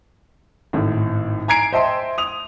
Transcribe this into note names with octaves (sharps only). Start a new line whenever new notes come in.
G#1 A2
G#5 A#5 G#6 C7 D7
C5 D#5 E5 G5 A5 C6
D#6 F7